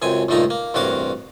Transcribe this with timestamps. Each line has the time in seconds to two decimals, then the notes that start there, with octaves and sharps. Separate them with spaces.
0.02 C#2 F#2 C4 G#5
0.29 C#2 G2 A#2 A3 D#4 A#5
0.50 A#3
0.74 A1 G2 C3 F#4 A#4 D6